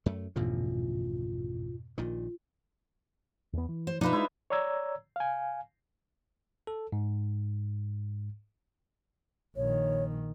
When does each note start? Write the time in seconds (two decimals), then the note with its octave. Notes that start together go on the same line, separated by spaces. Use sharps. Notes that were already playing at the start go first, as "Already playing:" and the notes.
0.06 F#2 A3
0.36 A1 F2 G#2 B2 D3 F3 F4
1.98 A#1 A#2 D#3 F4
3.53 E2 B3
3.69 E3
3.87 C5
4.01 B2 F3 D4 D#4 F4 B4 E5
4.13 G#3 E4 C5 D#5
4.50 C#5 D5 A#5 E6 G#6
5.16 F5 G#5
6.67 A4
6.92 G#2
9.56 A#1 D#3 C#5